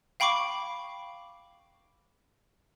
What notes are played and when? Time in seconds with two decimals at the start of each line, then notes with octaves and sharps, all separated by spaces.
0.20 F5 G5 B5 C#6 D6